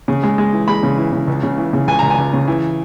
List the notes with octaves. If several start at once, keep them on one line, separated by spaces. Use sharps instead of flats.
C#3
G#3
G#3
E3
G#3 B5
C#3
E3
C#3
C#2
C#3
E3
C#3
C#2 G#5
C#2 A#5
G#5
C#2
C#3
E3